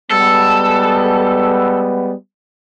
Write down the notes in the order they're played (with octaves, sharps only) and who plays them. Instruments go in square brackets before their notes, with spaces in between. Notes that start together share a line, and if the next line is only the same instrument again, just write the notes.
[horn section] G3 G#3 B3 [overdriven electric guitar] A4